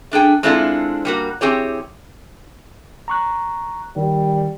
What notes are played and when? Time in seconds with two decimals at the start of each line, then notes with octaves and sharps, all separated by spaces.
0.12 A3 D4 G#4 G5
0.43 G#3 C4 D4 E4 F4 A4
1.05 G3 A#3 F#4
1.41 E3 C4 G4 G#4 C#5
3.08 A#5 C#6 F#6
3.96 D#3 G3